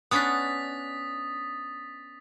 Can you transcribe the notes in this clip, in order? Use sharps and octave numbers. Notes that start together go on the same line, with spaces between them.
B3 C#4 D4 D#6 A6 B6